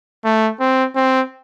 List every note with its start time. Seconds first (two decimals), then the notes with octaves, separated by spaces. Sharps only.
0.25 A3
0.60 C4
0.96 C4